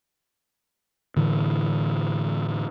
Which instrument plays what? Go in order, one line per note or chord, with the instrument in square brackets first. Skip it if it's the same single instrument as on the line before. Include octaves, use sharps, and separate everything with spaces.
[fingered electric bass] A2 D3 E3